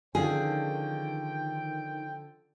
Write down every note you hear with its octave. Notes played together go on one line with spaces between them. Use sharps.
D3 D#3 F3 C#4 G#4 C5 G5